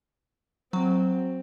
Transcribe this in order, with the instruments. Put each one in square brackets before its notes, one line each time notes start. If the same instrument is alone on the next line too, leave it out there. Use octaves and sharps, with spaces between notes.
[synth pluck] F#3 [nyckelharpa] C4